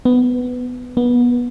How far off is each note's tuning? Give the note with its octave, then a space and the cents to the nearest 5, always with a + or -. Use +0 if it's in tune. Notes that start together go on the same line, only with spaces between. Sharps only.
B3 +10
B3 -25